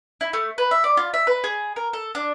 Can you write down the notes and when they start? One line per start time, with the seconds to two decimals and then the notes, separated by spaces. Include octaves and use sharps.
0.21 E4
0.33 A3
0.58 B4
0.71 E5
0.84 D5
0.97 F4
1.14 E5
1.27 B4
1.44 G#4
1.76 A#4
1.93 A4
2.15 D4